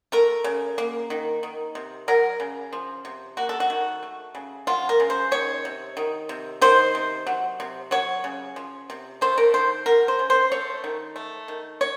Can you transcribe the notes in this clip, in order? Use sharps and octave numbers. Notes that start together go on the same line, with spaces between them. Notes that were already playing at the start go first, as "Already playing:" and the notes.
A3 A#4
C#3
A#3
D#3
D#3
C3
F#3 A#4
C#3
F3
C3
A#3 F#4
A4
F#4
D#3
A3
C#3
F#3 F4
A#4
C#3
C5
D#3 C#5
C3
D#3
C3
D#3 C5
C3
F#3
C3
F#3 C#5
C#3
F3
C3
A3 C5
A#4
D#3 C5
F#3 A#4
C5
C#3
C5
A3 C#5
D#3
A3
D#3
C#5